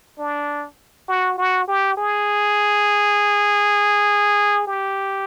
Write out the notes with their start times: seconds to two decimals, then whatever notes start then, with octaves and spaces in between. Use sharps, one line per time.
0.18 D4
1.08 F#4
1.38 F#4
1.68 G4
1.97 G#4
4.67 G4